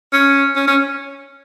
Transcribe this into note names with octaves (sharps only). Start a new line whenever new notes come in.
C#4
C#4
C#4